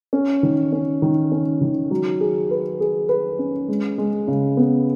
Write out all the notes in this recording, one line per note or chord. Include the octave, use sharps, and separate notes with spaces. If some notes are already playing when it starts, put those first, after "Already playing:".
C#4
D#3
C#4
D#3
C#4
D#3
F#3
G#4
B4
G#4
B4
C#4
G#3
G#3
C#3
B3